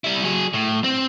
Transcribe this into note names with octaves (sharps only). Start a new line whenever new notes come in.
G3 E4
F#3 G#4
A2
C4